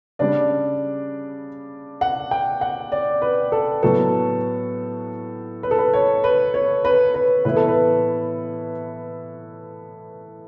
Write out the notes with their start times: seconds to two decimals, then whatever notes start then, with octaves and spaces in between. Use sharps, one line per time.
0.19 C#3 G3 D4 D5
2.01 F#5
2.31 G5
2.61 F#5
2.92 D5
3.22 B4
3.52 A4
3.82 A2 F#3 B3 A4
5.63 B4
5.71 A4
5.78 B4
5.93 C#5
6.24 B4
6.54 C#5
6.85 B4
7.14 B4
7.45 A2 E3 B3 E4 B4
7.56 A4
7.68 B4